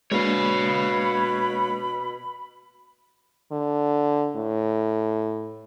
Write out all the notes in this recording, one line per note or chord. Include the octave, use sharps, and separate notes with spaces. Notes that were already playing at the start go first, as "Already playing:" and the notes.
B2 G#3 A#3 D4 C#5 F5 B5
D3
A2